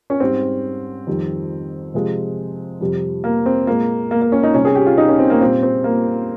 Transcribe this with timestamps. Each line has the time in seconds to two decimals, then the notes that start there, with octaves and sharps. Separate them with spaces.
0.10 C#4
0.20 G#2 G3 C4
1.07 F2 D#3 G3
1.94 C3 F3 G#3
2.81 F2 C3 G3
3.24 A#3
3.46 C4
3.67 A#2 G#3 A#3
4.11 A#3
4.22 A#3
4.32 C#4
4.43 D#4
4.54 C3 G3 C#4
4.65 G#4
4.75 G4
4.86 F4
4.98 D#4
5.08 C#4
5.19 C4
5.30 A#3
5.41 A#2 G3 C4
5.63 C4
5.84 A#3